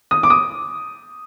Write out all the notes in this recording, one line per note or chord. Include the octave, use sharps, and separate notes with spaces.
D#6
D6
D#6